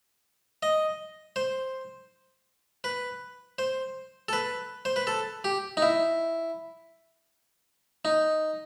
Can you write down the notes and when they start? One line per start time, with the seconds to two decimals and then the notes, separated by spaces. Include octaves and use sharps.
0.63 D#5
1.36 C5
2.84 B4
3.59 C5
4.29 A4
4.33 B4
4.85 C5
4.96 B4
5.07 A4
5.44 G4
5.77 D#4
5.82 E4
8.05 D#4